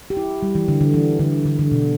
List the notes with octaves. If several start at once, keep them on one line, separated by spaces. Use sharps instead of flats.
G4
E4
G3
E3
D3
D3
E3
D3
D3
D3
B2